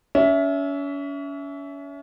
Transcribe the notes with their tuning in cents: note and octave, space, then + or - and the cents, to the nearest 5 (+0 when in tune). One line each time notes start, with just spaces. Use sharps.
C#4 +35 E5 +0